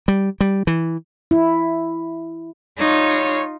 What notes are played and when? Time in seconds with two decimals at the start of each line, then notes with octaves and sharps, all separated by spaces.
0.08 G3
0.41 G3
0.67 E3
1.31 E4
2.79 G3 D#4 F4 C#5